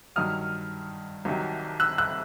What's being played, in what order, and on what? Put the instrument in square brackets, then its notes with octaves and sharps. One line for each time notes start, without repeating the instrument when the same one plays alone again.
[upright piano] G2 D#3 F#3 D#6 F6
C2 C3 D#3 F#3
E6 F#6
E6 F#6